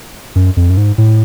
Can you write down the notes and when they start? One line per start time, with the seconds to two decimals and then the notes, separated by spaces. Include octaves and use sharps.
0.35 F#2
0.57 F2
0.70 F#2
0.77 G#2
0.98 A2